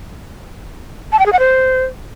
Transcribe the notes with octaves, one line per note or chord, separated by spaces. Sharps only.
A5
G5
G#4
F#5
C5